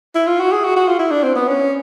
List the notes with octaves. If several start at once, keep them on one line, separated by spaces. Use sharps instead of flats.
E4
F4
F#4
G#4
F#4
F#4
F4
E4
D4
C4
B3
C#4